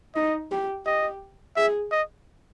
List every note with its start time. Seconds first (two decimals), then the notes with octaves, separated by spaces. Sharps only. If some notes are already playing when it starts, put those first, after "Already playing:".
0.15 D#4 D#5
0.51 G4
0.86 G4 D#5
1.56 G#4 E5
1.91 D#5